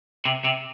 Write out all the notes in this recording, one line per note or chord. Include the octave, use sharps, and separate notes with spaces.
C3
C3